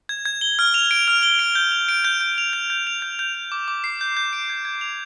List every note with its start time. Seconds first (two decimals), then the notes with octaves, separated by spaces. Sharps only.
0.09 G#6
0.25 G#6
0.41 G7
0.59 F6
0.74 F7
0.91 D7
1.08 F6
1.23 G7
1.39 D7
1.55 G6
1.72 F7
1.89 D7
2.05 G6
2.21 G6
2.38 F7
2.53 G6
2.70 G6
2.87 F7
3.02 G6
3.19 G6
3.35 F7
3.52 D6
3.68 D6
3.84 C7
4.01 G6
4.17 G6
4.33 D7
4.50 G#6
4.65 G#6
4.81 F7